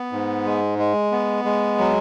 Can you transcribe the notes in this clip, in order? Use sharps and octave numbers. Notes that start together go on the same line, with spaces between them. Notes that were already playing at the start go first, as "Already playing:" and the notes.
Already playing: B3
G#2
G#3
G#3
B3
G#3
F#3